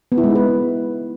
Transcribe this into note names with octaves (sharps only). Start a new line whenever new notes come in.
B3
E4
G#3
D#4
B4